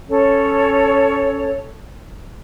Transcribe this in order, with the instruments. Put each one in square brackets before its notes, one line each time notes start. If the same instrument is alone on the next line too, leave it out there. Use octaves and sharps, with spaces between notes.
[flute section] C#4 A4 C#5